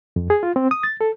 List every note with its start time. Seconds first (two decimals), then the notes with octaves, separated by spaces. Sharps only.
0.16 F2
0.30 G#4
0.43 F4
0.56 C4
0.71 D#6
0.83 A6
1.01 A4